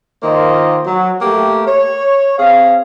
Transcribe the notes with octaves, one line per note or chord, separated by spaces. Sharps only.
D#3 A#3 F4 C5 D#5
F#3
A3 A#3 G4
C#5
C4 G#4 F5